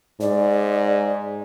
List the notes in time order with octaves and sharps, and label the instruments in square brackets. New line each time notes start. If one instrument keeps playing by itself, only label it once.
[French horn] G#2 [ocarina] D5